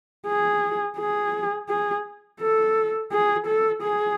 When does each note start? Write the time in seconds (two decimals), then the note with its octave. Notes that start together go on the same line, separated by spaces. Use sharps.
0.27 G#4
0.97 G#4
1.69 G#4
2.40 A4
3.12 G#4
3.46 A4
3.82 G#4